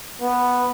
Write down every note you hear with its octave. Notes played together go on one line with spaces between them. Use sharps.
B3